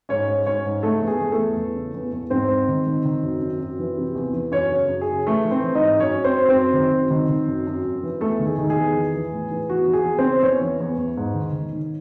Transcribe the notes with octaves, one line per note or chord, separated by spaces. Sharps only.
G#2 C#4 C#5
G#2
G#2 C#4 C#5
G#2
C#3 A3 A4
E2
G#4
E2
A3 A4
E2
E2
C#3
E2
E2
G#2 C4 C5
G#2
D#3
D#3
D#3
F#2
F#2
F#2
E3
C3
E2
E3
F#2 C#4 C#5
C#3
F#2
G#4
C#3
E3 A3 A4
E3
C4 C5
E3
D#4 D#5
G#2
F#2 C#4 C#5
F#2
C4 C5
F#2
C4 C5
F#2
D#3
F#2
D#3
D#3
F#2
F#2
F#2
E3
E2 A3 A4
D#3
G#4
D#3
G#4
E2
E3
E3
A2
E3
E2 F#4
E3
G#4
E2
C4 C5
C#3
E2 C#4 C#5
E3
E2
E2
G#2
D#3
D#3
D#3